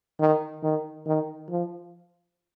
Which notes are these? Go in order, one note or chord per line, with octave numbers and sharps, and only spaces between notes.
D#3
D#3
D#3
F3